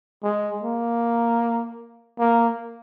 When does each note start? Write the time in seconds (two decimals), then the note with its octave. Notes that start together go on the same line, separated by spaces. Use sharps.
0.24 G#3
0.62 A#3
2.19 A#3